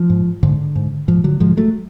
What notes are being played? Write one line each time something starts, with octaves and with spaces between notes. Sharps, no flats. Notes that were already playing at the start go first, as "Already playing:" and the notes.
Already playing: F3
G#2
G#2 D3
G#2
G#2 F3
D3 F#3
G#2 F3 G#3
F#3 A3